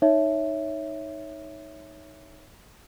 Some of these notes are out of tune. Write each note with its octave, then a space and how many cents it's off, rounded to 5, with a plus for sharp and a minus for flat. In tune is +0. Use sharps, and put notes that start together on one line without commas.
D#4 +0 C#5 +0 E5 +0